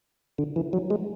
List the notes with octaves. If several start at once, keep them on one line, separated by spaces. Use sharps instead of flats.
D3
E3
F#3
G#3